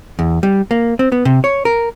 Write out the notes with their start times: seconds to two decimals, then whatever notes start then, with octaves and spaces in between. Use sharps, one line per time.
0.19 E2
0.43 G3
0.71 A#3
0.99 C4
1.12 B3
1.25 C3
1.44 C#5
1.65 A#4